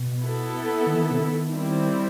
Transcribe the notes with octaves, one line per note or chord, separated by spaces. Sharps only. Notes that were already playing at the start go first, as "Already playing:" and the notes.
Already playing: B2
B3 E4 A4
D#3
E3
D#3
C3
D#3
G3 C4 E4